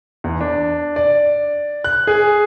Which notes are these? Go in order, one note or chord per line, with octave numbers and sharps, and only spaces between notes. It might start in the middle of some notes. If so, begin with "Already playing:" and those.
E2
D4
D5
F#6
G#4